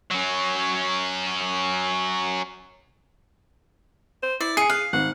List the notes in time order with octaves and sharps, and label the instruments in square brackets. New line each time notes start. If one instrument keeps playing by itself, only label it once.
[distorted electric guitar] F#3 C#4
[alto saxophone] C5
[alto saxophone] E4 [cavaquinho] D5
[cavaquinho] G#4 [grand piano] C7 C#7
[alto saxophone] G#4 [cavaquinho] F5 [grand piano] F#6
[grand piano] G#1 [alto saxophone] F#5